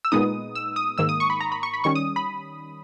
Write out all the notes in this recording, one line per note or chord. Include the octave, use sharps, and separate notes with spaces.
E6
A#2 G#3 B3 D#4 D#6
E6
D#6
G#2 D#3 A#3 E6
D#6
C#6
B5
A#5
B5
C#6
B5
D#3 G3 C#4 C#6
D#6
B5